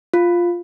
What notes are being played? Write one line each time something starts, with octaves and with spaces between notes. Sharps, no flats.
F4